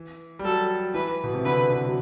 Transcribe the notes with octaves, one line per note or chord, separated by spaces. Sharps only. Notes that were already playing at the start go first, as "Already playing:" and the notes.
Already playing: E3
G3
F#3 A4
E3 B4
B2
C3
D3 B4
D3
F#3